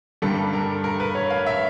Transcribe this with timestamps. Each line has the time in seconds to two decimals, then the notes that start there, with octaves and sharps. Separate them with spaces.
0.22 G2 D3 G3 A#3 A4
0.53 A#4
0.84 A#4
1.00 B4
1.15 C#5
1.30 F5
1.46 E5